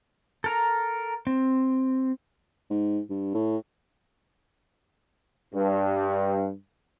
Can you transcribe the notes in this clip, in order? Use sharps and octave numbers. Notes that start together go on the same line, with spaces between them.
A4 A#4 A#5
C4
G#2
G2
A2
G2